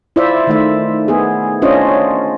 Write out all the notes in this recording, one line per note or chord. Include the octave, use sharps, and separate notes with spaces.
E4 F4 C5 D5 E5
D#3 A3 E5
B3 G#4
C#4 D4 F4 C5 C#5 D#5